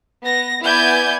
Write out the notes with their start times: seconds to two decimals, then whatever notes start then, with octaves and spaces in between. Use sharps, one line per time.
0.24 B3 A#6
0.64 B3 E4 D5 G#5 G6 G#6